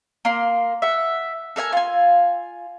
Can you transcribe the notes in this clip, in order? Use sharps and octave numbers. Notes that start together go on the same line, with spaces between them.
A#3 C6
E5 F#5
A4 A#4 E5 G#5
F4 G#5